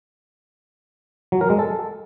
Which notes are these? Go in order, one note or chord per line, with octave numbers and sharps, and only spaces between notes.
F#3
A#4
G#3
A4